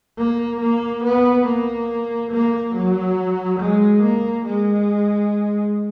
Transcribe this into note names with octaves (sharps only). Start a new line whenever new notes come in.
A#3
A#3
B3
A#3
A#3
F#3
G#3
A#3
G#3